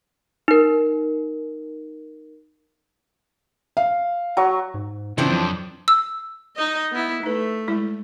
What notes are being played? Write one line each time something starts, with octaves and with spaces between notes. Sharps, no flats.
D#4 A#4
F5
F#3 C#6
G#2
C#3 E3 F3 C4 D4
F2 F#3
E6
D#4 D#5
B3 E4
A3 D#4 B4
G3 G#3 E4